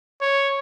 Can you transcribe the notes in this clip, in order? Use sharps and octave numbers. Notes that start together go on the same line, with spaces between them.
C#5